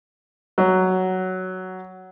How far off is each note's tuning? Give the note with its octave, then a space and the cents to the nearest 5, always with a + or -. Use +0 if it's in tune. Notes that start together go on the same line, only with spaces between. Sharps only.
F#3 +5